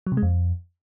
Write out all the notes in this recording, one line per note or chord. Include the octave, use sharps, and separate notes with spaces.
F#3
C3
G#3
F2